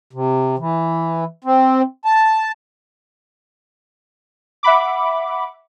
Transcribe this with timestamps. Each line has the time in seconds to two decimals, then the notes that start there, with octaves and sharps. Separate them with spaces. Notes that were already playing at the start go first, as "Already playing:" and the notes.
0.13 C3
0.58 E3
1.44 C4
2.05 A5
4.63 E5 F#5 B5 D6